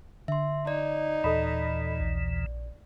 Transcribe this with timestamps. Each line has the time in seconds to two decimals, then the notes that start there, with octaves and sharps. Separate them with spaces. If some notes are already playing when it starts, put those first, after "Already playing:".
0.28 D3 E5 C6
0.67 D#4 D5
1.24 D#2 A#2 E3 A4 D#5 B5
2.00 A#1